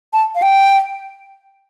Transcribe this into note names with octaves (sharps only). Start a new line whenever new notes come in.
A5
F5
G5